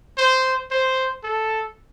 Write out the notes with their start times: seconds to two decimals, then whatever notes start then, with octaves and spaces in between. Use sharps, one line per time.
0.17 C5
0.71 C5
1.24 A4